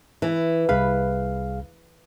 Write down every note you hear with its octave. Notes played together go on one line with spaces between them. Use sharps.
E3
C2 G#4 B4 F5